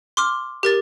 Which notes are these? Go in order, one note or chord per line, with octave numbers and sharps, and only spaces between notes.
C6 D6 F6
G4 A#4 A6